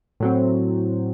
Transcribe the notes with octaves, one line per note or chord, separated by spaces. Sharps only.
A2 F#3 C4